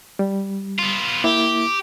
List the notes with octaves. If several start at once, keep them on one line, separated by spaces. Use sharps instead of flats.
G3
B3 F4
A#3 E4 G4